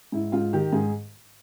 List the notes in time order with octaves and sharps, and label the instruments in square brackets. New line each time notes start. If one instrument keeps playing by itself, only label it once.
[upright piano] G#2 E4
G#2 F4
D#3 G4
G#2 G#4